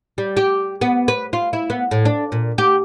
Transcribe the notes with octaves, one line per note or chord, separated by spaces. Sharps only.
G3
G4
B3
B4
F4
E4
B3
A2
D4
A#2
G4